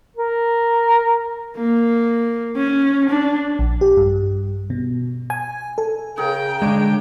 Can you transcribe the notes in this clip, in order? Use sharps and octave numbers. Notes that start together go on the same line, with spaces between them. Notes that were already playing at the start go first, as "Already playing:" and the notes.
A#4
A#3
C#4
D4
A#1
G4
G2
B2
G#5
A4
C#3 G#4 A#4 G5
D3 G#3 D4 C#5